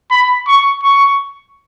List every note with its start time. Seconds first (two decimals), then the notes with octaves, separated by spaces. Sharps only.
0.11 B5
0.47 C#6
0.83 C#6